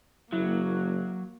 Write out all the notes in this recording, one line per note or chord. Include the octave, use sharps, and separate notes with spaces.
F#1 F#3 A#3 E4